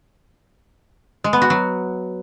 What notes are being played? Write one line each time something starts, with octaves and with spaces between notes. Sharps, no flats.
G#3
B3
F#4
F#3